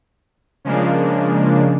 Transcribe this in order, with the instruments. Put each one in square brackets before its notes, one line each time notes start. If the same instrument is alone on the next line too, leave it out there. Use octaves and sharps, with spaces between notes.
[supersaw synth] C#3 F3 G#3 A#3 D4